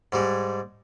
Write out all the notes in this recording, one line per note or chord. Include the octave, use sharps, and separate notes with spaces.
G#2 G3 G#3